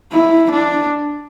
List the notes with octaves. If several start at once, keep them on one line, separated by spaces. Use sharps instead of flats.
E4
D4